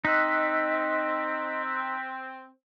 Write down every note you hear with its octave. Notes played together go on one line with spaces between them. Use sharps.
C4 D#4 D#5 E6 F#6 B6